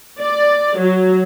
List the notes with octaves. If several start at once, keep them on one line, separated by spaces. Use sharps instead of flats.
D5
F#3